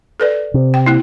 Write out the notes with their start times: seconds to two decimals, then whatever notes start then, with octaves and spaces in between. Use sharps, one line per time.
0.20 A4 B4 D5
0.54 C3
0.74 G5
0.86 A#3 E4